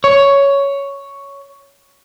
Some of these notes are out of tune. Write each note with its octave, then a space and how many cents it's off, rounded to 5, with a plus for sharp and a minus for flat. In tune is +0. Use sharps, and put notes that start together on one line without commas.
C#5 +5